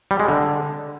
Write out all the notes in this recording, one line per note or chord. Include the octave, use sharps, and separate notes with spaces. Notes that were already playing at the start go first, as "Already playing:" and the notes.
G3
G#3
D3